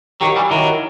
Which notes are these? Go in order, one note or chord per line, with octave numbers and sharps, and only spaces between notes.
D#3 F#3 G4
E3 G3
D#3 F#3 E4